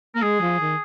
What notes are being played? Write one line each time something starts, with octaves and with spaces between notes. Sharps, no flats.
A#3 A#4
G#3 G#4
F3
D#3